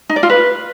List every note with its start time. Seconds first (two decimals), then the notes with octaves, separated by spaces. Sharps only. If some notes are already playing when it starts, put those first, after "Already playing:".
0.09 D#4
0.16 D5
0.23 F4
0.30 B4